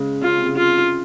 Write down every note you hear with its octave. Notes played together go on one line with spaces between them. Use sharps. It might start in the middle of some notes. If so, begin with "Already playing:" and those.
Already playing: C#3 G#3
C#3 F4
C3
C#3
F4